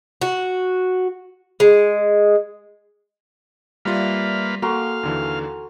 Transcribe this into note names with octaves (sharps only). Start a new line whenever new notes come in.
F#4
G#3
G3 A#3 F4 B4 D5 E5 F5
A#3 F#4 A4 F5 G#5 A#5 C6
D#2 D3 E3